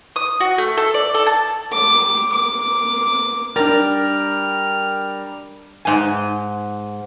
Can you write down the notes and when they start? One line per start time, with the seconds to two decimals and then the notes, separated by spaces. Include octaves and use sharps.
0.16 D#6
0.40 F#4
0.58 A3
0.77 A4
0.94 D5
1.14 A4
1.27 A5
1.73 D6
2.33 D6
3.56 G3 D4 A#4 F6 A6
5.85 G#2 G#5